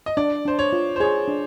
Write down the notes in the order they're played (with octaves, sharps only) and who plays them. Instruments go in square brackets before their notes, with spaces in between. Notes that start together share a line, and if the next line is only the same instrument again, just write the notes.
[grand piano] D#5
[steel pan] D4 [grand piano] D5
[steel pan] D4 [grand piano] C5
[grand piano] C#5
[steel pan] F4
[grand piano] C5
[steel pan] G#4 [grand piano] C#5
[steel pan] D4